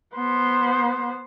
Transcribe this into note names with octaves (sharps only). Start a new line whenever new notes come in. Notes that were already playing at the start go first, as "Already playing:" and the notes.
B3 C5